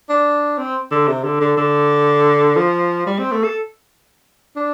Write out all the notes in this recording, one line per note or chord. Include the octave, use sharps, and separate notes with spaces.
D4
C4
D3
C3
D3
D3
D3
F3
G3
C4
A3
A4
D4